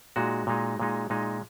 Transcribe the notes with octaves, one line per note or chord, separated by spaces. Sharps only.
A#2 G#3 D#4 F#4
A#2 G#3 D#4
A#2 G#3 D#4
A#2 G#3 D#4